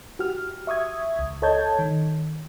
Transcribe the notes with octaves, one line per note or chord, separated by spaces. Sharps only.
F#4 G4 F6
E5 C#6 D#6 G#6
C#2
A4 C#5 D#5 A5 G6 G#6
D#3